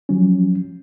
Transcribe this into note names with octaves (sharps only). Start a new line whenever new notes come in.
F3 F#3 C#4